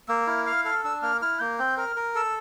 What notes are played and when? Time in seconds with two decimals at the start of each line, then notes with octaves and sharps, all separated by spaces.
0.08 A#3 E6
0.27 E4 F6
0.46 F5 F6
0.65 A4 F6
0.84 D4 E6
1.02 A#3 F6
1.21 E4 F6
1.39 A#3 G6
1.58 C4 G6
1.77 A#4 F6
1.96 A#4
2.15 A4 E6